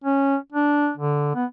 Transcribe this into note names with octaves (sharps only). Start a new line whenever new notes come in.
C#4
D4
D3
B3